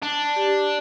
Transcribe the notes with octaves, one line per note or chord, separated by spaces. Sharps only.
D4
G4